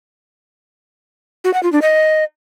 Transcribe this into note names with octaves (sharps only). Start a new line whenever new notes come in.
F#4
F#5
F4
D4
D#5